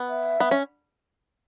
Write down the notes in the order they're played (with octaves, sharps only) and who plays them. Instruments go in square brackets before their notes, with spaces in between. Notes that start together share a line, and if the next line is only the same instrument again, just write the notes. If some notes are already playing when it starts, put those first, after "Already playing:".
Already playing: [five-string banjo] B3
[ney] E5
[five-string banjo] B3
C#4